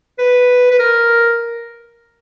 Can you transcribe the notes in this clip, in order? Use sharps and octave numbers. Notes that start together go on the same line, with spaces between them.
B4
B4
A#4